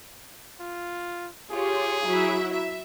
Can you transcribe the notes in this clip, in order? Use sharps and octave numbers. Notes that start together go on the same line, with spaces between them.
F4
F4 G4 G#4 C#5
F#3 E4 E5
E5